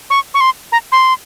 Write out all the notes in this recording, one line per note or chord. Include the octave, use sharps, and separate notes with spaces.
C#6
C#6
C6
A#5
C6